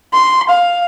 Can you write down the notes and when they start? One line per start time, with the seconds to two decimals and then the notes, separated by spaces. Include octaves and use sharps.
0.14 C6
0.49 F5